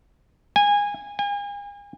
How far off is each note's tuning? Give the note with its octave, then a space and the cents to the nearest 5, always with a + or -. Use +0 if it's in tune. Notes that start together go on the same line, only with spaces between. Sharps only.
G#5 -20
G#5 -40